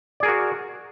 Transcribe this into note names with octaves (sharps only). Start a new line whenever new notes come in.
F#4 G#4 A#4 D5